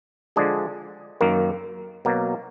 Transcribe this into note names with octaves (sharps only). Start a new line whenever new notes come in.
D3 F3 G#3 D4 G#4
F#2 D#3 A#3
B2 F#3 A#3